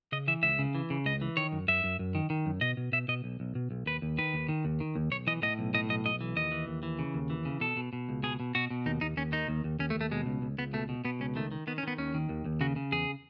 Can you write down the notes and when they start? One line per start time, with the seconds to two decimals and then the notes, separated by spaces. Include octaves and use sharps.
0.12 C#3 D#5
0.28 E3 E5
0.43 C#2 E5
0.59 C#3
0.75 E3
0.90 C#3
1.06 C#2 D#5
1.22 E3
1.37 D#3 C#5
1.52 F#2
1.68 F#2 E5
1.84 F#2
1.99 F#2
2.15 D#3
2.30 D#3
2.46 F#2
2.61 B2 D#5
2.77 B2
2.92 B2 E5
3.08 B2 D#5
3.24 B1
3.40 B1
3.55 B2
3.71 B1
3.86 D#2 B4
4.02 D#2
4.18 D#3 B4
4.34 D#2
4.49 D#3
4.65 D#2
4.80 D#3
4.95 D#2
5.11 B1 C#5
5.27 E3 D#5
5.42 A2 D#5
5.59 B1
5.74 A2 D#5
5.89 B1 D#5
6.05 B1 D#5
6.21 E3
6.36 D#2 D#5
6.51 E3
6.68 D#2
6.83 E3
6.99 C#3
7.14 D#2
7.30 E3
7.45 C#3
7.60 B2 A4
7.77 B2
7.93 B2
8.09 C#2
8.23 B2 G#4
8.40 B2
8.55 B2 F#4
8.70 B2
8.86 D#2 D#4
9.01 D#2 D#4
9.17 D#2 C#4
9.33 D#3 D#4
9.48 D#2
9.64 D#2
9.79 D#2 C#4
9.90 A3
9.95 D#2
10.01 A3
10.11 B2 G#3
10.26 C#2
10.42 C#2
10.58 C#2 B3
10.73 B2 A3
10.89 B2
11.05 B2 B3
11.20 C#2 C#4
11.36 D#3 A3
11.52 D#3
11.67 D#3 B3
11.78 C#4
11.83 D#3 B3
11.98 D#2 C#4
12.14 D#3
12.29 D#2
12.45 D#2
12.61 C#3 F#4
12.76 C#3
12.92 E2 G#4